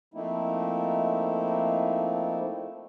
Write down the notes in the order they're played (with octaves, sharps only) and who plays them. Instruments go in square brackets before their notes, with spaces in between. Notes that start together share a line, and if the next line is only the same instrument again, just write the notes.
[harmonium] F3 A3 A#3 C4 D#4 E4